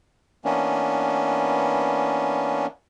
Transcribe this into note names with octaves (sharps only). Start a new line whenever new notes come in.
E3 A#3 B3 C#4 D4